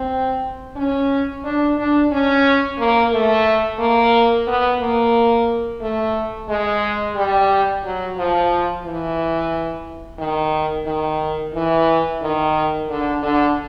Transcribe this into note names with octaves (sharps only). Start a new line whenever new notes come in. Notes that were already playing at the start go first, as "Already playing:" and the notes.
Already playing: C4
C#4
D4
D4
C#4
A#3
A3
A#3
B3
A#3
A3
G#3
G3
F#3
F3
E3
D#3
D#3
E3
D#3
D3
D3